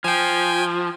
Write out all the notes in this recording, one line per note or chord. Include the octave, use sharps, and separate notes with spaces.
F3 G5 G#5